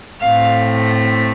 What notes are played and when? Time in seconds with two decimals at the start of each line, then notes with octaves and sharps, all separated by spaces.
0.21 A2 A3 C4 F5